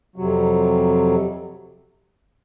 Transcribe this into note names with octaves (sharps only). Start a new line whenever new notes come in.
F2 C3 F#3